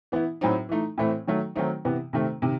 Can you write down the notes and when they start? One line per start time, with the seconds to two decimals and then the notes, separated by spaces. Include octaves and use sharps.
0.12 E3 B3 E4
0.41 A2 F#3 C4 D#4
0.69 E3 A3 D#4
0.98 A2 E3 A3 C4
1.27 D#3 F#3 A3
1.56 D#3 F#3 A3 C4 D#4
1.85 C3 E3 B3
2.13 C3 D#3 A3 C4
2.42 C3 D#3